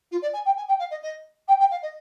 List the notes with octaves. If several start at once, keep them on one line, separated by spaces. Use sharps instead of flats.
F4
D5
G#5
G5
G#5
G5
F5
D#5
D#5
G5
G5
F5
D#5